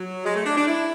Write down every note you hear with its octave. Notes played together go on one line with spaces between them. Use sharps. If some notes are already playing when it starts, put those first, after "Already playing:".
Already playing: F#3
G#3
A3
D4
D4
E4